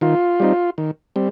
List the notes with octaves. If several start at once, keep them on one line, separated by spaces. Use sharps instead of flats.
D#3 F4
G3 C4 D#4
D#3
G3 C4